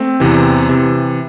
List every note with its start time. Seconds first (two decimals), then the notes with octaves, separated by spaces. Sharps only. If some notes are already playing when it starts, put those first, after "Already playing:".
Already playing: A3 C4
0.20 E2 C3 E3
0.69 C3 E3